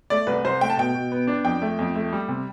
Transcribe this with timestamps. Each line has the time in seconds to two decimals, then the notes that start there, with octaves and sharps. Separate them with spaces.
0.10 A3 D5
0.27 C2 B4
0.45 C2 C5
0.61 A3 G5
0.70 A5
0.77 B2 G5
0.94 B2
1.12 B3
1.27 D4
1.45 F2 G5
1.62 A3
1.79 F2
1.95 A3
2.13 G3
2.28 C3